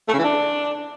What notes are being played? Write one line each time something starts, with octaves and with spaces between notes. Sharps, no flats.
A3
C#3
E3
D4